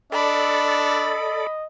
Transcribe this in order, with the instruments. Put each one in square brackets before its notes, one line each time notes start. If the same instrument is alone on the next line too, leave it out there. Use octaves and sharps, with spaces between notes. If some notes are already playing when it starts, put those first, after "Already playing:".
[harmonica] D4 [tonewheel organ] A4 D5 [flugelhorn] D#5 [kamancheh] B5